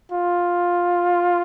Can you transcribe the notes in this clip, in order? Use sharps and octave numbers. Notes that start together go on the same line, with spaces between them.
F4